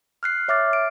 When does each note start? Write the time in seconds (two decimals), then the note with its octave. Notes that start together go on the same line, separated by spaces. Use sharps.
0.23 F6 F#6 C7
0.48 C#5 E5 D6 F6 A6
0.73 D7